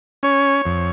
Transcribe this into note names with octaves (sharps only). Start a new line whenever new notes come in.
C#4 C#5
F2